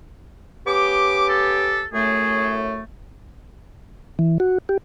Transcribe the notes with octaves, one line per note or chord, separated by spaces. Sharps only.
B3 C#4 G4 D6
A4
F#2 A2 A3 G#4
E3
F#4
G4